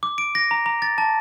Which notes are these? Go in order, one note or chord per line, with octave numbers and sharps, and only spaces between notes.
D6
D7
A#6
A#5
A#5
A6
A5